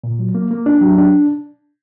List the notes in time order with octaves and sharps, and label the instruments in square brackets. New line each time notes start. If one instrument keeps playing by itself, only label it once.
[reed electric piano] A#2
F#3
A#3
A#3
D4
F#3
D4